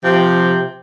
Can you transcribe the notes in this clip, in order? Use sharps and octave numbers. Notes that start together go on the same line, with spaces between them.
C3 F3